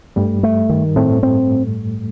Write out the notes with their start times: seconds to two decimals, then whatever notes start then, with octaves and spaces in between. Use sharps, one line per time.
0.16 G2 G3 A3
0.43 A3
0.70 D#3
0.96 A2 A3 C4
1.23 C4